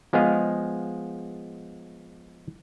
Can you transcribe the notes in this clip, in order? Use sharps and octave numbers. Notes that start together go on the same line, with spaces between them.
F3 G#3 B3 G#4 D#5 F5